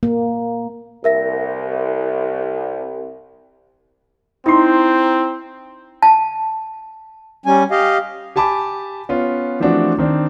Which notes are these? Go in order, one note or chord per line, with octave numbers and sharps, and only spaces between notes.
A#3
C2 A#4 E5 A#6
C4 D#4 E4 C6
A5
G3 C#4 G#5
G4 D#5 F5
G4 G#5 A5 B5 D6
B3 C#4 F4
E3 F3 A3 C4 D4 F#4
D#3 C4 D4